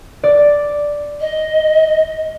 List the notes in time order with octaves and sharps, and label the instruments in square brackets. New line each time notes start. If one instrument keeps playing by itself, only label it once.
[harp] D5
[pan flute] D#5